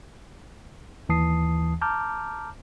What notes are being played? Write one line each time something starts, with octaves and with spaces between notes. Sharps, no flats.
D#2 E3 A5 D#6 C7
A5 A#5 D6 F6 G6